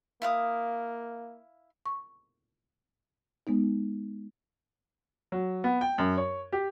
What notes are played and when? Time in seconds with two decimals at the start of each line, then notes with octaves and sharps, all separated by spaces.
0.22 A#3 E4 F5 D#6
1.86 C#6
3.47 G#3 B3 D#4
5.32 F#3
5.64 B3
5.81 G5
5.98 F#2
6.17 C#5
6.52 G4